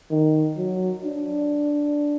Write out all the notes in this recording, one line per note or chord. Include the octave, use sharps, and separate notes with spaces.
D#3
F#3
D4